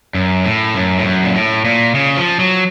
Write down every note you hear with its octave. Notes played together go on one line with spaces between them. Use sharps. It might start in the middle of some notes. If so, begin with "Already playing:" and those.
F#2
A2
F#2
A2
F#2
A#2
A2
A#2
C#3
F3
F#3